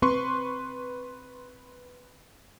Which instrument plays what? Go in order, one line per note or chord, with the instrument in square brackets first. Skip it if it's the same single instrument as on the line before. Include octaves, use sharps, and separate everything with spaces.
[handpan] C4 [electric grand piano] B4 C6 C#6